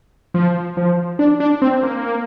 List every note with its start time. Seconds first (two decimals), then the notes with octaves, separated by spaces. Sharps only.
0.34 F3
0.77 F3
1.19 D4
1.40 D4
1.62 C4
1.83 A#3